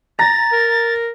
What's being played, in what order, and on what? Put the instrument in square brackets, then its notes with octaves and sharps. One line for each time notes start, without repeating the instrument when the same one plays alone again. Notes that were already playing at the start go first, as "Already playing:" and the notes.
[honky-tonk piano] A#5 A#6 [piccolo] A6
[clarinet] A#4